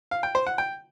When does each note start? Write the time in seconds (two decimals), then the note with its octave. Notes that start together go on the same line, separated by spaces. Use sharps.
0.11 F5
0.23 G5
0.35 C5
0.47 F#5
0.58 G5